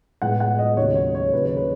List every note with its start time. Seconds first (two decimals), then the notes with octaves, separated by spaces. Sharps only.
0.22 A2 G#3 B3 F#5
0.40 F#5
0.59 D#5
0.77 D#2 C#3 F#3 A3 C#5
0.95 C#5
1.15 C#5
1.33 D#2 C#3 F#3 B4
1.45 C#5
1.57 B4